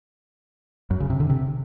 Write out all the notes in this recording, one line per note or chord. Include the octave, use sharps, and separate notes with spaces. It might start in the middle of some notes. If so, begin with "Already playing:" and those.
F#2
C#3
C3
D3
C3